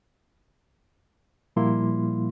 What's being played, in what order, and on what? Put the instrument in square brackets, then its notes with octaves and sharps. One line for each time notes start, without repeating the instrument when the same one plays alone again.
[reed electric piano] A#2 F3 G3 A#3 E4 C6